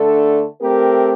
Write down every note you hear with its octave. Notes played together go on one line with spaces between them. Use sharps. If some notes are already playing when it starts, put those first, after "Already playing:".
Already playing: D3 A3 D4 A4
A3 C4 G4 A#4